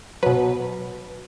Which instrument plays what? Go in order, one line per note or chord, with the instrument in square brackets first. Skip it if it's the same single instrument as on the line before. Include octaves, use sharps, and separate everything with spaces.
[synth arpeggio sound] B2 F#3 B4